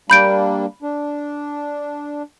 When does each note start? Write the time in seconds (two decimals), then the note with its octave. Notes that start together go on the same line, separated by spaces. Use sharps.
0.10 G3 A#3 D4 B5 G6 D7
0.83 D4